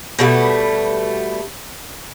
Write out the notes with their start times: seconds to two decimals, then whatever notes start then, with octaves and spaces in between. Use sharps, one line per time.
0.19 B2 G3 A3